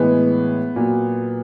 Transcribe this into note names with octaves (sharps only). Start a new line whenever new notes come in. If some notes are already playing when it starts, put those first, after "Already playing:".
Already playing: A2 E3 G#3 B3
A#2 F#3